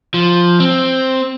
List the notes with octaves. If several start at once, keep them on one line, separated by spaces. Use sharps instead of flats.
F3
C4